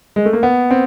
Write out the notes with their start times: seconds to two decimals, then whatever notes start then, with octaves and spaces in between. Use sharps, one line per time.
0.16 G#3
0.26 A3
0.33 A#3
0.43 B3
0.70 C4